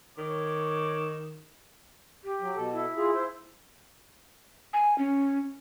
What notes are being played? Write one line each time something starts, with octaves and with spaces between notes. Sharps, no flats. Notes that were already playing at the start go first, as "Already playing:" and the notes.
D#3 C#5 D6
G4
F#3
B2 A4
E4
F4 G#4
C5
G#5
C#4